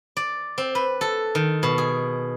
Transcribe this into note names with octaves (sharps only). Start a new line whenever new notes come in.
D5
C4
B4
A4
D#3
B2
G#4